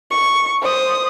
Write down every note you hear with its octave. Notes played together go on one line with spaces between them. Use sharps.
C#6
C5 D#6